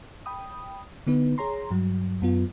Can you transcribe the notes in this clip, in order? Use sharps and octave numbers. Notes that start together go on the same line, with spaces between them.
G5 B5 D#6
D3 B3 D#4 B4
G#4 C#5 A#5 C6
G2 F#3
F#2 B3 F4